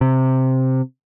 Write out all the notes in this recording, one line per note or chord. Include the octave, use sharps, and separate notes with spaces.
C3